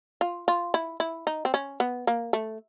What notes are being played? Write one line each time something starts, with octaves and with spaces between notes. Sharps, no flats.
F4
F4
E4
E4
D#4
C4
C#4
B3
A#3
A3